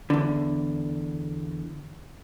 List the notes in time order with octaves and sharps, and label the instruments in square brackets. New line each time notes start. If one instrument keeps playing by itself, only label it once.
[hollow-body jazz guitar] E2 D3